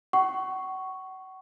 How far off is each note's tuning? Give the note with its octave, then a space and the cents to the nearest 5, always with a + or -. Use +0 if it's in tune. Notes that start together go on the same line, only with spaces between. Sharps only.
F#5 +35 C#6 +0